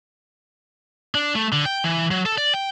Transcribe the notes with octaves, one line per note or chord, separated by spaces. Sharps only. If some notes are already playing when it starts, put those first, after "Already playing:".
D4
A3
D3
G5
E3
F#3
A4
D5
G5